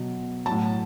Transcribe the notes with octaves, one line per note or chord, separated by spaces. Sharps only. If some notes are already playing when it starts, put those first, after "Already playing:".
Already playing: B2 F#3
F#3 A5
A2